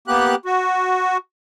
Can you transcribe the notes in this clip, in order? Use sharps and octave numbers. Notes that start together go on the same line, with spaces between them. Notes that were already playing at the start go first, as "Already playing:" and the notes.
A#3 B3 G4 F#6
F#4